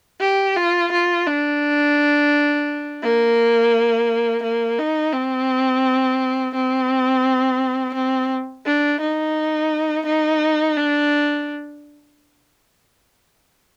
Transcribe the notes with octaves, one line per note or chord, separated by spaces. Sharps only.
G4
F4
F4
D4
A#3
A#3
D#4
C4
C4
C4
D4
D#4
D#4
D4